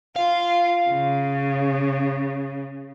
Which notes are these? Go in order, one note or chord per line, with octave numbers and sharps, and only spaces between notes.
F4 F5
C#3